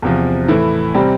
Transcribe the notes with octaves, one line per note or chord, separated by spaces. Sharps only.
E2 C3 F3
A2 E3 A3 E4
C3 G3 C4 G4